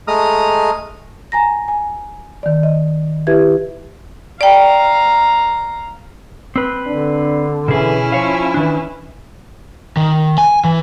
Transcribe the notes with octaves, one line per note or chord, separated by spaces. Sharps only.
G#3 A3 A#5 D#6 F6
G#5 A#5 A#6
G#5
D#3 D5
D#5
E4 G4 B4 E5 G#6
D5 F5 G5 A#5
C4 B4
D3 D4
B2 E3 C#4 E4 G#4 G#5
F3 F4 C#5 F5
D#3 E3 D4
D#3
G#5
E3